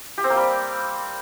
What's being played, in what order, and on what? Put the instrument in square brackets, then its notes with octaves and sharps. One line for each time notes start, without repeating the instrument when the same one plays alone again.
[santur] G4
C4
A#3
G3